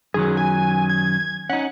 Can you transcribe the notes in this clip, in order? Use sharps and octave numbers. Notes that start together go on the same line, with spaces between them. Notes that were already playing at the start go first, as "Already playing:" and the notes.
F#2 D#3 F#3 G#4
G#5
G#6
C#4 D#4 F#5